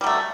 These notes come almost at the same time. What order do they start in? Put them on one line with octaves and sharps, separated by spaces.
G3 F#3 A3